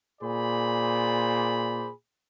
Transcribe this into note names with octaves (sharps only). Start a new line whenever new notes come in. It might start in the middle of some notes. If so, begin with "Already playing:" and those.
A#2 G#4 C5 D5 B5